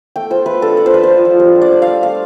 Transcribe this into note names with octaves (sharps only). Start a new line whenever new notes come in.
A3 G5
F4 C5
A3 B4
D4 A4
F4 D5
C5
F3 B4
C5
F3
F3
G3 C5
D4
D5
D4
F5
G3
A3 F5